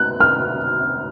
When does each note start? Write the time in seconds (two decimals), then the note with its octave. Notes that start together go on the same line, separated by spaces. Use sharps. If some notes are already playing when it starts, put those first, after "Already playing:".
Already playing: F#6
0.20 F6